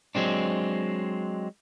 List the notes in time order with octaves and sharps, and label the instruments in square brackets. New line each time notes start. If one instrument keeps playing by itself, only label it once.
[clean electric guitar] F#3 G#3 C4 D4